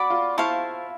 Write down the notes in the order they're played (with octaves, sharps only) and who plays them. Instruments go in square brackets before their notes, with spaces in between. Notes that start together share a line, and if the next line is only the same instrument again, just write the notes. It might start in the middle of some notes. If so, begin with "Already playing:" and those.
Already playing: [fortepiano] F#4 [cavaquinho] D5 F#5 B5 D6
[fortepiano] F4
[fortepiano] E4 [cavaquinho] C5 F5 A5 C#6